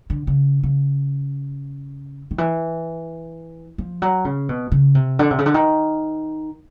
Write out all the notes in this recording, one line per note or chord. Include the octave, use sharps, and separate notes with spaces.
D3
C#3
C#3
D#3
E3
F3
F#3
C#3
B2
C#3
C3
D3
C3
C#3
D3
D#3